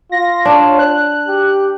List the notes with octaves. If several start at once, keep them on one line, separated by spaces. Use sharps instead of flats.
F4 A#6
D4 C#5
F#6
G4